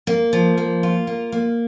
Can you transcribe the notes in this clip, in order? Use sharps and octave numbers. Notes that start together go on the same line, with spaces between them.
A#3
F3
A#3
F4
A#3
A#3